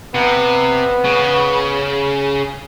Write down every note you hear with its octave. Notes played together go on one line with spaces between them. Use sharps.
C3 B3
C#3